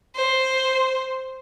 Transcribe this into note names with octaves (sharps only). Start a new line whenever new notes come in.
C5